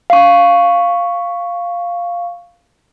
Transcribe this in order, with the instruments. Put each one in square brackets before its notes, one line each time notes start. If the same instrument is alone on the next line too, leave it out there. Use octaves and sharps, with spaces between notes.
[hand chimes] F5 C#6